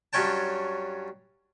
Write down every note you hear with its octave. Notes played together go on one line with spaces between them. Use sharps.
G2 F#3 C#4 C#5 G5 A5